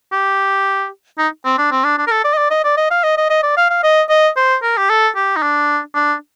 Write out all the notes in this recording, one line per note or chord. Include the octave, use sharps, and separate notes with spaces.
G4
D#4
C4
D4
C4
D4
D4
A#4
A4
D5
D#5
D5
D#5
D5
D#5
F5
D#5
D#5
D#5
D5
F5
F5
D#5
D#5
C5
A#4
G4
A4
G4
D#4
D4
D4